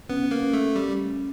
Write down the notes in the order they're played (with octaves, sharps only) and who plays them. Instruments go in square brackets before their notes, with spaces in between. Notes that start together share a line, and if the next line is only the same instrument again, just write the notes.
[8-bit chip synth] B3 [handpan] C#4
[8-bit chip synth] A#3
[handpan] C#4
[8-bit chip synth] A3
[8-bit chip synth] G3 [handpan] C#4